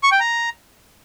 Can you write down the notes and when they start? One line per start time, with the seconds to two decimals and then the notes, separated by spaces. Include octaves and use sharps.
0.03 C#6
0.12 G5
0.20 A#5